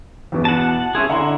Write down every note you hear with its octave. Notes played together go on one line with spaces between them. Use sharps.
E2 B2
F#5 A5
C#4 E4 G#4 C6
D3 E4 F#5 A#5 C6